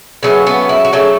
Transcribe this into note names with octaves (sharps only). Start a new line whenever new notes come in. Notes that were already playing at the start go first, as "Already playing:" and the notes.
C#3 F#3 A3 B3
B3
E4
F#4
C#3 F#3 A3 A4